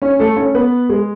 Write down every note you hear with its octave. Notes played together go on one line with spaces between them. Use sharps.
C#4 C#5
A3 A4
C#4 C#5
B3 B4
G#3 G#4